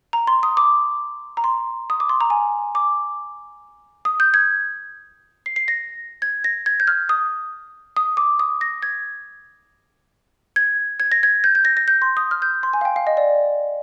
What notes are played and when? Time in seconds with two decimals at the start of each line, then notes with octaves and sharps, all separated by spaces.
0.13 A#5
0.27 C6
0.43 D#6
0.57 D6
1.37 A#5
1.44 C6
1.90 D#6
2.00 D6
2.09 C6
2.21 A#5
2.30 G#5
2.75 D6
4.05 D#6
4.20 G6
4.34 G#6
5.46 C7
5.56 C7
5.68 A#6
6.22 G#6
6.44 A#6
6.66 G#6
6.80 G6
6.87 F6
7.09 D#6
7.97 D#6
8.17 D6
8.39 D#6
8.61 A#6
8.83 G#6
10.56 G#6
11.00 G#6
11.12 A#6
11.23 G#6
11.44 G6
11.55 G6
11.65 A#6
11.77 A#6
11.88 G6
12.02 C6
12.17 D#6
12.31 F6
12.42 G6
12.63 C6
12.73 G#5
12.81 F5
12.85 G5
12.96 F5
13.07 D#5
13.17 D5